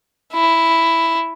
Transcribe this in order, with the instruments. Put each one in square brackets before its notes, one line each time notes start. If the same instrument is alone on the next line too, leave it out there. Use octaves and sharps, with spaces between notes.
[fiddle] E4